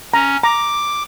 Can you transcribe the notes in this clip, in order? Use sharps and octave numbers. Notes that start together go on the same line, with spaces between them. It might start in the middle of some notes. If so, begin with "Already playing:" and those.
C#4 A#5
A#5 D6